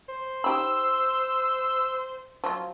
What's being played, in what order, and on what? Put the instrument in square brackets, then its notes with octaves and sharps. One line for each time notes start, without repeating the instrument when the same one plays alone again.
[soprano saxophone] C5
[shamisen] D#4 G4 B5 [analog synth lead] E6
[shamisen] F3 F#3 F4